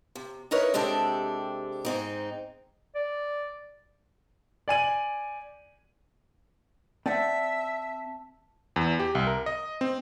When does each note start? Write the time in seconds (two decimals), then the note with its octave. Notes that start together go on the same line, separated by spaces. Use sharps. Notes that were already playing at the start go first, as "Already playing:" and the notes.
0.15 C3
0.51 D#4 E4 A#4 B4 C#5
0.74 C3 G#3 C4 D4 G4 A4
1.85 G#2 C4 D#4
2.95 D5
4.68 D5 G#5 D#7 F#7
7.06 C4 D5 E5 F#5 G5 A5
8.76 E2
8.99 G4
9.15 C2
9.27 A#4
9.46 D#5
9.81 C4